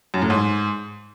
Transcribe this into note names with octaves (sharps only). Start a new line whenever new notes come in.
F#2
A2
G#2